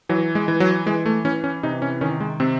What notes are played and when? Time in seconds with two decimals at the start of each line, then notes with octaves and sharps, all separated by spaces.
0.09 E3 F#3
0.35 G#3
0.48 E3
0.60 F#3
0.86 E3 G#3
1.06 A3
1.25 E3 C#4
1.44 C#4
1.63 C3 D#4
1.82 C#4
2.01 D#3 C#4
2.20 G#3
2.40 C3 C4